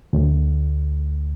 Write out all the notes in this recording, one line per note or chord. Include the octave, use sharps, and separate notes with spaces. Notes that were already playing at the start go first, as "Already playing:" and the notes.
D2